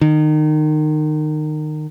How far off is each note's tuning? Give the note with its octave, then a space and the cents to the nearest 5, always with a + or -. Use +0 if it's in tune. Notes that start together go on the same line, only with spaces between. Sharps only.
D#3 -25